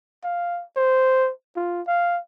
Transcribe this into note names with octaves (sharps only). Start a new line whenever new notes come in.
F5
C5
F4
F5